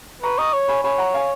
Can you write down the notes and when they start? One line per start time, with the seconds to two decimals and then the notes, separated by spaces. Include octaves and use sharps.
0.23 B4 A#5 C#6
0.38 D#5 A#5 C#6
0.53 C#5
0.68 G#5 B5
0.83 C#5 G#5 B5
0.98 F#5 A#5
1.14 F5 G#5